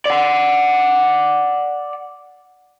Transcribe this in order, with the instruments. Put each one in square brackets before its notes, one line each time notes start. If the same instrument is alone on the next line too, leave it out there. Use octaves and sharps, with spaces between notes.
[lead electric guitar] D5 F#5